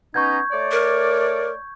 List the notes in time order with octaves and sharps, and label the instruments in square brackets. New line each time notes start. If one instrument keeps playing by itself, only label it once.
[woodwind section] B3 C#4 D#4 [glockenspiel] C#6 G6 G#6
[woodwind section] A3 C#5 D5
[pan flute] A#4